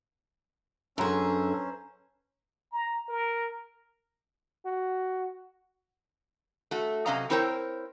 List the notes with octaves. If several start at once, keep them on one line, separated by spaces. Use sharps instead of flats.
F#2 C#4 D4 G#4 A4 B4 C5 A#5
A#5
A#4
F#4
A3 F#4
C3 F#3 C#4 D#5 F5 A#5
C4 E4 A#4 C5 C#5 G5